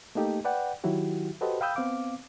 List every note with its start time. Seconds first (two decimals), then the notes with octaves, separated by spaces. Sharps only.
0.15 A3 A#3 D#4 G4 A4
0.45 B4 D5 F#5 G5
0.84 D#3 F#3 E4 F#4 G4
1.41 F#4 G4 A4 B4 C5 D#5
1.61 F5 G5 B5 D#6 E6 G6
1.76 B3 C4 F5 D6